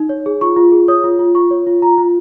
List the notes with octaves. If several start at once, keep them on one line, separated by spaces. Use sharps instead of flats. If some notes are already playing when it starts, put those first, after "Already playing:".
Already playing: D#4
C#5
G#4
F4 C#6
F4
G#4
C#5 D#6
F4
F4
F4 C#6
C#5
F4
F4 A#5
F4